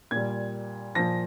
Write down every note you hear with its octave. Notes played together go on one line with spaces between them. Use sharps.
A#2 G3 G#6
A#2 F3 A#6